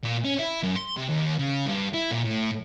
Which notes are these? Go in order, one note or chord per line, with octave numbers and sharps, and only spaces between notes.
A#2
C#4
E4
F#2
C6
C3
D#2
C#3
G2
E4
A#2
A2